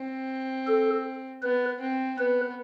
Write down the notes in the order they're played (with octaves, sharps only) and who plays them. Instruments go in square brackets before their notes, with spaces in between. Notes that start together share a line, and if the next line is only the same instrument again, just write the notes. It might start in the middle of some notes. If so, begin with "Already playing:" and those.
Already playing: [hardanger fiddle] C4
[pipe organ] A4
[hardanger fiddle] B3 [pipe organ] B4
[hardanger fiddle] C4
[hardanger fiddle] B3 [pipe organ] B4